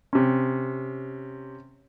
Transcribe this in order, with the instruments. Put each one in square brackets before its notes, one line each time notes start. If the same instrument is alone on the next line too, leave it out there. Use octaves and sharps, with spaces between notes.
[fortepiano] C3 C#4